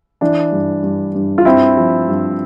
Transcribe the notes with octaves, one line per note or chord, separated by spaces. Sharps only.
E3 D4
G2
G2
G2
F4
G2 C4 E4
F3
G2